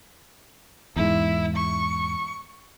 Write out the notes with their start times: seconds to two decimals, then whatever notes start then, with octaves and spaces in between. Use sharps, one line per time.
0.96 E2 G#2 E4
1.56 C#6